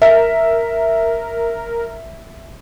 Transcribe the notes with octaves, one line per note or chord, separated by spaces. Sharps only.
A#4 E5